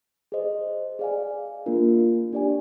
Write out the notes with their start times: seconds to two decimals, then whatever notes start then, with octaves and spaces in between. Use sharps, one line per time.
0.32 G#4 C5 D#5
0.99 G#4 D5 F5 G#5
1.66 A#3 D4 F4 A#4
2.33 D4 G4 D5 G#5